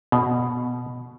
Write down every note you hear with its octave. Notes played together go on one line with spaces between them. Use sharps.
B2